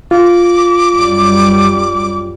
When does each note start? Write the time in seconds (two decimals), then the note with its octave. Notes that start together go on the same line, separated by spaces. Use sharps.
0.11 F4 D6
0.93 F#2 G3